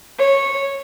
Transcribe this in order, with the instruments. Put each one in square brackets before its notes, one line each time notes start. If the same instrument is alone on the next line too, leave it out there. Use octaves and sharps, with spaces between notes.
[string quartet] C#5